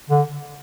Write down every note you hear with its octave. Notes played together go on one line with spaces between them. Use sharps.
D3